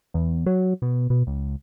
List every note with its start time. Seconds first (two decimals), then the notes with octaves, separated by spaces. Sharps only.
0.14 E2
0.46 F#3
0.82 B2
1.10 B2
1.27 C#2